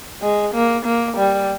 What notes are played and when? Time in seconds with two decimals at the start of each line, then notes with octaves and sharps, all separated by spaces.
0.22 G#3
0.54 A#3
0.86 A#3
1.17 G3